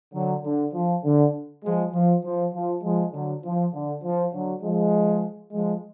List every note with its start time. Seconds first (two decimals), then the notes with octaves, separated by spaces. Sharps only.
0.13 D3 F#3
0.43 D3
0.73 F3
1.03 D3
1.63 F3 G#3
1.93 F3
2.23 F3
2.53 F3
2.83 F3 G#3
3.13 D3 F#3
3.43 F3
3.72 D3
4.03 F3
4.33 D3 F#3
4.63 F3 G#3
5.53 F3 G#3